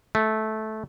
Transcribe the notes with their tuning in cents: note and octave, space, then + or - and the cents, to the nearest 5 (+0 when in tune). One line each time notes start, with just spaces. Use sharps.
A3 -15